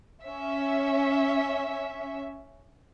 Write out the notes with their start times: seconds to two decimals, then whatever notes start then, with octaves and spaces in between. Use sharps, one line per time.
0.23 C#4 E5